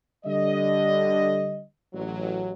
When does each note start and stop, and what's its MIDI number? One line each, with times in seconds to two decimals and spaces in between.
0.25 1.61 50
0.25 1.61 55
0.25 1.61 75
1.93 2.53 33
1.93 2.53 54